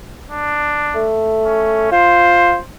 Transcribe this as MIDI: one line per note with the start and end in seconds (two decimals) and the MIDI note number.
0.30 1.11 62
0.95 1.89 57
1.45 1.91 61
1.92 2.56 65
1.92 2.63 72